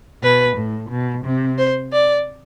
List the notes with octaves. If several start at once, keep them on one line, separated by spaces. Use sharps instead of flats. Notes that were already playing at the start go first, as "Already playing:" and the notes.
B2 B4
A2
B2
C3
C5
D5